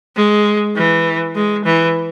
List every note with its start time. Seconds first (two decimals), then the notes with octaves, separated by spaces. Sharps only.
0.16 G#3
0.75 E3
1.35 G#3
1.65 E3